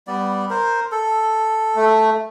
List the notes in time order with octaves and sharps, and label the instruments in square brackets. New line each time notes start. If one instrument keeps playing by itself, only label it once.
[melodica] G3 B3 D5
A#4 C5
A4
[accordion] A3